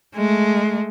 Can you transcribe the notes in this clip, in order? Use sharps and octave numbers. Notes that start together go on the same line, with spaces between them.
G#3 A3